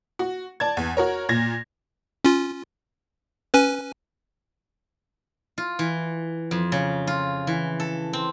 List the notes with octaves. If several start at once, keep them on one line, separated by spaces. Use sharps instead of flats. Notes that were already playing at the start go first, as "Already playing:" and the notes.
F#4
D5 A5 G#6
E2
F#4 A#4 C#5
A#2 G#6 A#6
C#4 F4
C#4 B4 G#5
F4
E3
F2
C#3
F4
E3
A4
C4